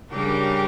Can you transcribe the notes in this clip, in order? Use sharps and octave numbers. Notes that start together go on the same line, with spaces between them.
C#3 G3 D4 G4 A#4